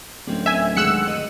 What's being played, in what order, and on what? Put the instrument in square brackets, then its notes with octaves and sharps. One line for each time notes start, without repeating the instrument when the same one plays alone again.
[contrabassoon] D1 [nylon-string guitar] C4 C#4 D5
[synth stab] E5 G#5
[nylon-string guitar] D#3 G#3 F#5 [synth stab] E6 F#6 C#7
[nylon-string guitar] D#5